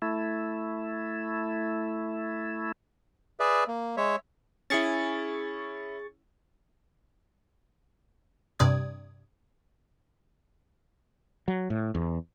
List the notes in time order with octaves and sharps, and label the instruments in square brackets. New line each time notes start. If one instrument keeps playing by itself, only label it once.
[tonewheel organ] A3 E4
[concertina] G#4 B4 D5 E5
A#3
G#3 C#5 E5
[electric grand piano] C#4 E4 [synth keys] G#4 C#6 A6
[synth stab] G2 C3 D5 D#6 G#6
[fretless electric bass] F#3
A2
E2